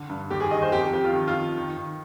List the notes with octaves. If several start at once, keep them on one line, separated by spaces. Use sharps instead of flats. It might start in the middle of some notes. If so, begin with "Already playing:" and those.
Already playing: D3
G2
D#2 G4
G#4
D#3 D#5
C5
F2 G4
F2 G4
F4
D#3
F4
D#3
D#3
D#3